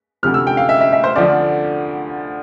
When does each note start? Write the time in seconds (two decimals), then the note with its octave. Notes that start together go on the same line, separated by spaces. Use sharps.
0.23 D2 C3 F3 F6
0.34 E6
0.47 G5
0.57 F5
0.69 E5
0.81 E5
0.93 E5
1.04 C5
1.16 D2 D3 F3 D5